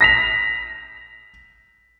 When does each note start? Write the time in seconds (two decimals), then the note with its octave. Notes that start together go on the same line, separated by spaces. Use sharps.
0.01 A#6 B6 F7